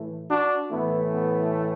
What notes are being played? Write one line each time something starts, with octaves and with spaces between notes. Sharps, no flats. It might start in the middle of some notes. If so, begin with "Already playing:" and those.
Already playing: A2 E3 A3
D4 F#4
A2 E3 A3 B3 E4
B3